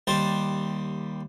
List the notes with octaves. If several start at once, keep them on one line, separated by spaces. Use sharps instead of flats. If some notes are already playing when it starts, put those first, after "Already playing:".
D#2 G3 C5 A5